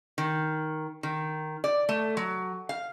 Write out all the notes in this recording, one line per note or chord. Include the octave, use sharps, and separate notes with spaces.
D#3
D#3
D5
A3
F#3
F5